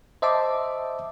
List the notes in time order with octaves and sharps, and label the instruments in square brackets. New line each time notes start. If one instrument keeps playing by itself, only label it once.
[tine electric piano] C5 D#5 E5 A5 C6 D6